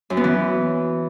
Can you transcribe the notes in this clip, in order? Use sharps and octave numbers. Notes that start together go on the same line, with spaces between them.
F#2
B3
E3